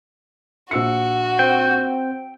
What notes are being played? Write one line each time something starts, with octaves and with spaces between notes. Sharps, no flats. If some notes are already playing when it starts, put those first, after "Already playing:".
A#1 F#4 E6 C#7
C4 C5 G5